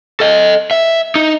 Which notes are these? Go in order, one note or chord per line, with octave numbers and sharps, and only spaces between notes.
A4 D#5
E5
D#4